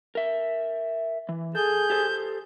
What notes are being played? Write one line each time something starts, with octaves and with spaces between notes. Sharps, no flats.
A#4 E5
E3
G#4 A4 G6
G4 A4 C5